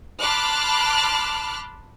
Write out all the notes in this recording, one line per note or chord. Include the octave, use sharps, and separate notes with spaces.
A5 B5 C6 D6 F6 F#6